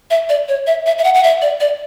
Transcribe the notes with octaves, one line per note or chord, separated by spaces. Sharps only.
E5
D5
C#5
E5
E5
E5
F#5
F#5
E5
D5
D5